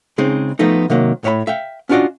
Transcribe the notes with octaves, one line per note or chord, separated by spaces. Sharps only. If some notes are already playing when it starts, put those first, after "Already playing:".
C#3 G#3 C4 D#4
F3 A3 B3 D#4
C3 D#3 F#3 A#3
A2 C#5 E5 F#5 B5
E5 F5 G5
C#4 D4 F4 F#4 D5 D#5